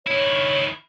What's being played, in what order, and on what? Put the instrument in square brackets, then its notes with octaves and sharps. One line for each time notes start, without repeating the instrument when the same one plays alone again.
[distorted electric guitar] D#3 E4 [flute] C#5